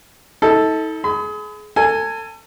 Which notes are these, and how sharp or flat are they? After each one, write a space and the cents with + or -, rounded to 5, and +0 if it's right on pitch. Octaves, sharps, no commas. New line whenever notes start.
D#4 +45 A4 +0
G#4 +30 B5 +40
A4 +35 G#5 +0